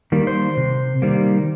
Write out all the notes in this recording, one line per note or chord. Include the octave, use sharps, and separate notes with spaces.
D#3 G3 A#3
C5
C3
D#3 G3 A#3